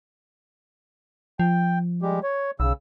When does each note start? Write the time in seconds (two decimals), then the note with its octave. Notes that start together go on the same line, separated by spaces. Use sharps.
1.39 F3 G5
2.02 G3 G#3 G4
2.23 C#5
2.60 B1 C#3 E6